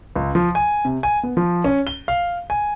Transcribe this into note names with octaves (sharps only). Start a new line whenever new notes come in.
C#2
F3
G#5
C3
G#5
B3
F3
C#4
G7
F5
G#5